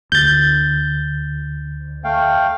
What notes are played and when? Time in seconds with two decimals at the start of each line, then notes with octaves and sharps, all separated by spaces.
0.12 D2 G6 A6
2.04 A3 F5 G5